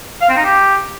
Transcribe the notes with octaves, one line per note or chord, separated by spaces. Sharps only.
F5
C4
D#4
G4